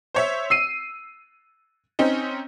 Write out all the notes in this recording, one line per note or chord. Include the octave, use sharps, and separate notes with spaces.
C5 C#5 E5
E6 C7 D#7
C4 C#4 D#4